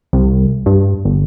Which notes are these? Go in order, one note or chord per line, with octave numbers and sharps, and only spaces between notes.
C2
G2
G1